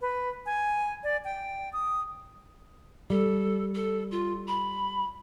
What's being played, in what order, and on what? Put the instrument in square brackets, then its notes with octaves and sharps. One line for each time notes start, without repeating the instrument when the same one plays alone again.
[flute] B4
G#5
D5
G5
D#6
[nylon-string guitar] G3 [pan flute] A4
[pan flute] A4
F4
B5